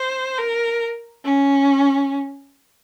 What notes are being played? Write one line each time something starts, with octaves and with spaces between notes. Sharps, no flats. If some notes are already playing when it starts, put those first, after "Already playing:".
Already playing: C5
A#4
C#4